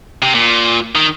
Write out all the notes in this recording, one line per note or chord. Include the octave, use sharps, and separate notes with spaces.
C3
A#2
D#3